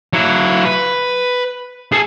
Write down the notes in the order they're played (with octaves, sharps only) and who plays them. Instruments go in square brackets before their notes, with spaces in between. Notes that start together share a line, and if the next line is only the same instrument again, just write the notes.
[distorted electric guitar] F#3 E4
B4
G#4 A4